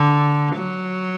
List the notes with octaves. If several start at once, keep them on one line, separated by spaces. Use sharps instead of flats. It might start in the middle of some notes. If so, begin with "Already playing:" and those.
Already playing: D3
F#3